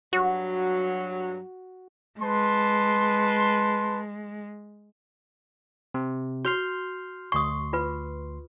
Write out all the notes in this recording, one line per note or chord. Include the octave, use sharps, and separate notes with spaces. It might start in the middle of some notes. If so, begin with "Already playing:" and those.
G2 F#3 F#4
G#3 B4 A5 C6
C3
F#4 C6 F6 G6
D2 C6 C#6 D#6
F4 B4